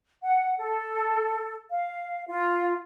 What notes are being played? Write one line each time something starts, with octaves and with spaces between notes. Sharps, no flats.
F#5
A4
F5
F4